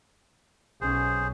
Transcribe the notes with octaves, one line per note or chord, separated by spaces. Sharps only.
B1 C#4 G#4 C5